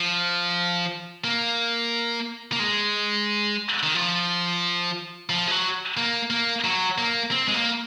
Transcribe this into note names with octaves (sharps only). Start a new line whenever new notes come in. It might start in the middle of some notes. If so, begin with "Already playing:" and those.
Already playing: F3
A#3
A#3
G#3
D#3
F3
F3
G#3
F#3
A#3
A#3
F#3
A#3
C4
G#3
A#3